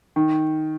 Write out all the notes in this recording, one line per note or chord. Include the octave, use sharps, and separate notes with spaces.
D#3